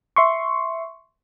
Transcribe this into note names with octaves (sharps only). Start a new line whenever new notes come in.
E5 C6 C#6